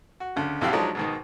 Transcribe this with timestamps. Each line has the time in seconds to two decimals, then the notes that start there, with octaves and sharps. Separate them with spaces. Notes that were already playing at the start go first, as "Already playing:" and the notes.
0.20 F#4
0.36 D2 C#3
0.61 B1 F2 E4 F#4 G4 F5
0.73 F3 F#3 G#3 D4 D#4
0.95 G#2 B2 D#3